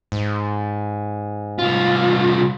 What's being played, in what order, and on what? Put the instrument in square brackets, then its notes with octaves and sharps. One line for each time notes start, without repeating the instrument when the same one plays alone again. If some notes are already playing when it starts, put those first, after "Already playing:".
[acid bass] G#2
[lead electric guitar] C2 F4